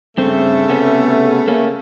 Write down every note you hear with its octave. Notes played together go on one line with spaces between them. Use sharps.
G2 C#3 A3 C4
C3 B3 C#4
A#3 C#4